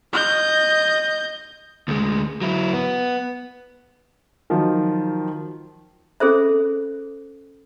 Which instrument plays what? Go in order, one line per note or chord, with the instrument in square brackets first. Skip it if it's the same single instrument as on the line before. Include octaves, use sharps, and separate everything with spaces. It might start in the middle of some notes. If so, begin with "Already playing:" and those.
[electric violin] D#5 G6
[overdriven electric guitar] D2 G#3
F#3 E4
B3
[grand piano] D#3 F3 F#3 F4
[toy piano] C#4 G#4 A4 C5 E5